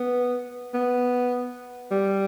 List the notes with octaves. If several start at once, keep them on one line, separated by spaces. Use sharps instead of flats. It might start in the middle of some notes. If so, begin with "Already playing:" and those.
Already playing: B3
B3
G3